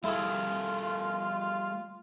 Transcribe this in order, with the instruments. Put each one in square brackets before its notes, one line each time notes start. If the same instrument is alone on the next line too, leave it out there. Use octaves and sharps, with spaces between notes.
[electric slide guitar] G3 A3 A4 [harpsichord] E4 G#4 [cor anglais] F4